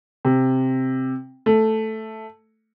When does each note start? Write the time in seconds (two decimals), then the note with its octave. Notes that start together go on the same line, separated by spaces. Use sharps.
0.25 C3
1.46 A3